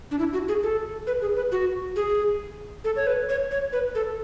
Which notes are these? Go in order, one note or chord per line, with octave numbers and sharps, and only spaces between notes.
D4
E4
F#4
G#4
A4
B4
G#4
B4
F#4
G#4
A4
C#5
B4
C#5
C#5
B4
A4